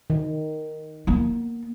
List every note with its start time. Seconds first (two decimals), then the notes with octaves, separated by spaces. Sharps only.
0.10 D#3
1.07 A#3 B3